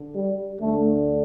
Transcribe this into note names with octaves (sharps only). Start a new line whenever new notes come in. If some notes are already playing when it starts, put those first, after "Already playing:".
Already playing: D3
G3
D2 D3 A3